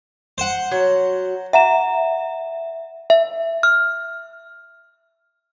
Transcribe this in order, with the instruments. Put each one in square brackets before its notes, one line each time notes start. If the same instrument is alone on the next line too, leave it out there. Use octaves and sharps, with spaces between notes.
[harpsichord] C5 F#5
[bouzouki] F#3
[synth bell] E5 [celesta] F#5 A#5 E7
[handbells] E5
F6